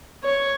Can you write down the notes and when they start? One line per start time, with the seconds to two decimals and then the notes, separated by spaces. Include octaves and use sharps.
0.24 C#5